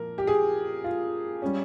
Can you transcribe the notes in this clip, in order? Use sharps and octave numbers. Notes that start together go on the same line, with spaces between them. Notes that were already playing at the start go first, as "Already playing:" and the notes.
Already playing: A#2 F3 A#4
G4
G#4
F4
G3 C#4